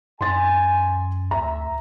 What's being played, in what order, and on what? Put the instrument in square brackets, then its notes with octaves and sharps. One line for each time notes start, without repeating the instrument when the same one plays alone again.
[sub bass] F#2 [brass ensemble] G#5 [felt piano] C6 A6
[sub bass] D2 [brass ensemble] E5 [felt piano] A#5